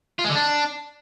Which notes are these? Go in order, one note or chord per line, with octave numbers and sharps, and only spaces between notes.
F4
G#3
D3
D4